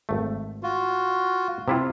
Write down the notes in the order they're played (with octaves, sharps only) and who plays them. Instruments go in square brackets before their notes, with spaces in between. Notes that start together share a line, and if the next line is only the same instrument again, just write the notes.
[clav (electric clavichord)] G#1 A3
[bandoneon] F4 F#4
[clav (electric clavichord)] C3 E4 F4